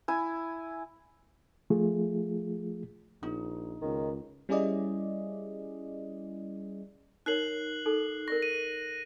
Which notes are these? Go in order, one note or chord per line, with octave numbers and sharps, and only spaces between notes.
E4 G#5
F3 A3 F4 G#4
A#1 D#4
C#2 D#3
G3 C#4 E4 G#4 D5 D#5
D#4 A#4 C#5 F#6 C7 F#7
D#4 G#4 A4
A#4 D5 C#6 A#6
D#7